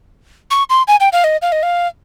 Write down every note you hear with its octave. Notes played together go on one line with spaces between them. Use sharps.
C#6
C6
G#5
G5
F5
D#5
F5
D#5
F5